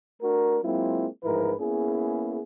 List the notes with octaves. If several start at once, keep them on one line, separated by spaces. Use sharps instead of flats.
A3 D4 F#4 A#4
F#3 G#3 A#3 C4 E4 F4
A1 G#2 F3 E4 A#4 B4
A#3 B3 C#4 E4 G#4